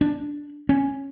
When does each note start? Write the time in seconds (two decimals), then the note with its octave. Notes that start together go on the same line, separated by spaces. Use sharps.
0.01 D4
0.69 C#4